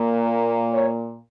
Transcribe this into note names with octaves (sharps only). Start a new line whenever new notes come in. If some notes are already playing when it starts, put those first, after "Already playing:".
Already playing: A#2 A#3
C#5